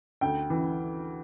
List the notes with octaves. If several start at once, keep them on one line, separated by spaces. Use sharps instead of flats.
D2 G5
E3